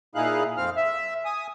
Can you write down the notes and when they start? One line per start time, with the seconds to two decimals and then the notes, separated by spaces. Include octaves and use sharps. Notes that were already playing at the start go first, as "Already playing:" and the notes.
0.15 A#2 D#4 E4 G#4 F5 F#6
0.57 F2 C4 F5 F6
0.77 E5
1.25 G#5 D#6